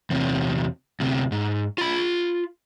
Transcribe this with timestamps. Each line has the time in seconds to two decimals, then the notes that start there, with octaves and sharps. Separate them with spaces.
0.10 E2 C3
1.00 D2 C3
1.32 G#2
1.78 F4 B5